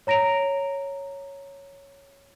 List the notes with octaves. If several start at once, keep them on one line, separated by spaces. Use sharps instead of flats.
C#5 A#5 A#6 D7 F7